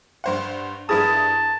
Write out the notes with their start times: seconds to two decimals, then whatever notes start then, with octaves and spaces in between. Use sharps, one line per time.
0.24 G2 C5 F#5
0.89 G2 E4 G#4 A#4 B4 A5 D#6